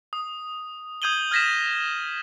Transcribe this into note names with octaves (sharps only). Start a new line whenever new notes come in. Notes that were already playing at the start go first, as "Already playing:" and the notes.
D#6
D#6 G6 G#6 D#7 F#7 G7
F6 G#6 A#6 B6 E7